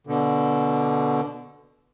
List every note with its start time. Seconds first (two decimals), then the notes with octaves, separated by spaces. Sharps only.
0.07 B2 D3